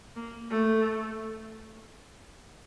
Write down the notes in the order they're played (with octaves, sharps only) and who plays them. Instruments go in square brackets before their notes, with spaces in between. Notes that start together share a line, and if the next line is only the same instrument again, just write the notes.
[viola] A#3
A3